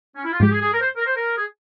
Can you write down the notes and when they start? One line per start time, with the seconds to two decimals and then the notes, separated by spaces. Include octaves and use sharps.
0.16 C#4
0.25 E4
0.32 F4
0.40 G#2 F3 G#3 G4
0.51 G#4
0.62 G#4
0.73 A#4
0.81 C5
0.97 A#4
1.06 C5
1.16 A#4
1.37 G#4